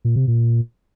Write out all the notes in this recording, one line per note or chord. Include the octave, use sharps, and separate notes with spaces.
A#2
C3
A#2